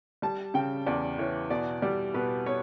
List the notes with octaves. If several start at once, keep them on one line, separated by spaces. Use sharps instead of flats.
G3 A5
C#3 G5
E2 D5
E3 C#5
B2 D5
G3 D5
B2 B4
B3 C#5